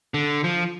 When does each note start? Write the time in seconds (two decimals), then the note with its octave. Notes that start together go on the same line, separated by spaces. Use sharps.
0.14 D3
0.44 F3